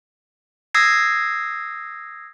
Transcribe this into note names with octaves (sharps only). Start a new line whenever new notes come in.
D#6 E6 G#6 A#6 C7